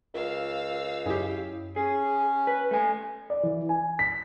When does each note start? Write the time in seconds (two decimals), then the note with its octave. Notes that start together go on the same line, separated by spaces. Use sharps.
0.14 C#2 F4 A#4 F5 E6
1.06 F#2 E4 G4 G#4 C#5
1.76 C#4 G#4
2.47 B4
2.71 A3 G#5
3.30 D5
3.43 E3
3.69 G#5
3.99 B6